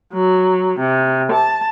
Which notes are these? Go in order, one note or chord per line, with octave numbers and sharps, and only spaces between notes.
F#3
C3
A5